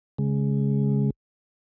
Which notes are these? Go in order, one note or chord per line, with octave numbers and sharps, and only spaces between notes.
C#3 G#3